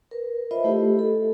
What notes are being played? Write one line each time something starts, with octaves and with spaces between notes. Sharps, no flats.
A#4 B4
F4 C5 D#5 E5 B5
A3 E4 G4 A4
A4